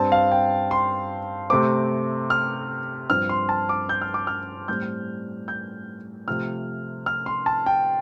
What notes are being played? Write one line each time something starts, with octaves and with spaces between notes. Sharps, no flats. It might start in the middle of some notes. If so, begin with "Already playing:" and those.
Already playing: G2 G3 C4 A5
F5
G5
C6
C3 A3 C4 D6
F6
G2 F3 C4 F6
C6
A5
D6
G6
F6
D6
F6
A2 G3 C4 G6
G6
C3 F3 A3 F6
F6
C6
A5
G5